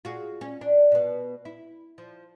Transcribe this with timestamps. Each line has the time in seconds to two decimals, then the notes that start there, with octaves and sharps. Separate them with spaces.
0.05 F4 F#4 G#4
0.41 C#4
0.61 D4
0.92 B2 B3
1.45 E4
1.98 F3